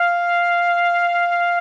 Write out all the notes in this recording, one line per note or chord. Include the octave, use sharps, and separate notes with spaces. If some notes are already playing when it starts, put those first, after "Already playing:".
Already playing: F5